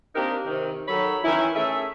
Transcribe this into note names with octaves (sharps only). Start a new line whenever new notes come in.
A#3 C4 D4 D#4 G4 A#4
C3 D#3
D#3 F#3 A4 C#5 B5
D#3 E3 C#4 E4
A3 C#4 G#4 A4 E5